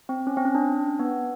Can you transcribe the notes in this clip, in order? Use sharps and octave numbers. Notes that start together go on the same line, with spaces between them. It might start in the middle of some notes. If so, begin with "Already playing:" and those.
C4
C#4
C4
C#4
D4
B3